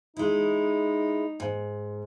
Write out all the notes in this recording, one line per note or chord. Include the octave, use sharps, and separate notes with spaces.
G#3 D#4 E4
G#2